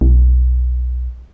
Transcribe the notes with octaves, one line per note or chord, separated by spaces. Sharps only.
B1